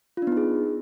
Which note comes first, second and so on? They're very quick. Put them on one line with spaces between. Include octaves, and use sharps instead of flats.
F4 D4 B3 D#4 G#4